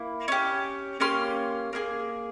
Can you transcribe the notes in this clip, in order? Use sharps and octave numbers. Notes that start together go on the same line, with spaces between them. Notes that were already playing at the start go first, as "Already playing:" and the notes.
Already playing: A#3 E4
C#4 G4
A#3 C#4 G4 C6
A#3 E4 G#4